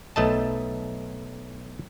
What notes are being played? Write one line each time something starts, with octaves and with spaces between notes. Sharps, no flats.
B1 A3 D#5 A5